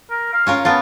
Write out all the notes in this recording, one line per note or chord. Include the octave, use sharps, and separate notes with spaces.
A#4
F5
C#4 F4 A#4
B3 F4 A5